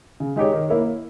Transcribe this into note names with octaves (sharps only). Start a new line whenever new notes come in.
C#3
G#3 D#4 G4 C#5
D#3
A#3 E4 A#4 C#5